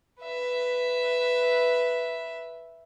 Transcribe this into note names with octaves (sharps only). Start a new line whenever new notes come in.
B4 E5